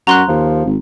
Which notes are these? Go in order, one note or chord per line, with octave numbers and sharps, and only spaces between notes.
F#2 F#4 A#5 C6 F#6
D#2 F3
G#1